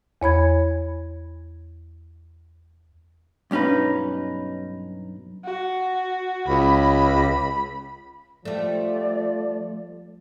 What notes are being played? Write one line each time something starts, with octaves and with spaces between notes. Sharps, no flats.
E2 C#5 B5 G#6
B1 G2 C#4 D#4 B4
F#4
C#2 B5
F3 G3 A3 D5